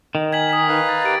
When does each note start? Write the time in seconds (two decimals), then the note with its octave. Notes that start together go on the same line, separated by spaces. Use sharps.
0.15 D#3
0.32 A#4 G#5 G#6 B6 F#7
0.49 D#6 G#6 B6
0.69 D#4 B4 F5
0.89 A6
1.02 G4 A#4 A6 D7